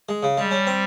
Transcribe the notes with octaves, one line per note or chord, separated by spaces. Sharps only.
G#3
C#3
G3 G#3
C#4
C4